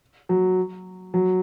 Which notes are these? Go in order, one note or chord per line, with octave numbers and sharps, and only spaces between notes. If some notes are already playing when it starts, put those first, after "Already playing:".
F#3
F#3